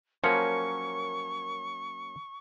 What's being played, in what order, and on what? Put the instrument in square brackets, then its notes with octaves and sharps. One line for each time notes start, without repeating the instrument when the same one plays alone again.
[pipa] F3 [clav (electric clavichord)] F#3 A#3 C#4 [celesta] A#4 C#7 [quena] C#6